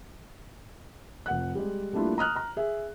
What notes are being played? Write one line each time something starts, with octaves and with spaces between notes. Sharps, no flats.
F1 F#5 F#6
G3 G#3
G3 A3 A#3 D4 E4 F4
A#5 D#6 F6 F#6
A#5 F6
G#4 E5